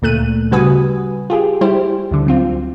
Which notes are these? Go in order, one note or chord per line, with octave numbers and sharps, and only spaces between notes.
D2 A#2 A3 F#6 D#7
C#3 G3 F#4 B4 G#5 D#6
F4 G4 G#4
G3 E4 G4 C5
D2 D3
F#3 C4 F4